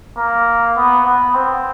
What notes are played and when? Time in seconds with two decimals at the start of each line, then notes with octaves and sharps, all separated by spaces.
0.18 A#3
0.77 B3
1.05 B3
1.35 C4